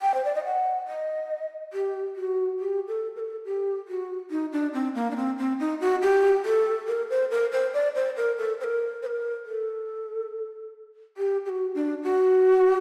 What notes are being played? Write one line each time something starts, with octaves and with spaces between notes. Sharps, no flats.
G5
C5
D5
D#5
F#5
D#5
G4
F#4
G4
A4
A#4
A4
G4
F#4
D#4
D4
C4
A#3
D4
C4
C4
D#4
F#4
G4
A4
A#4
C5
A#4
C5
D5
C5
A#4
A4
C5
A#4
C5
A#4
A4
G4
G4
F#4
D4
F#4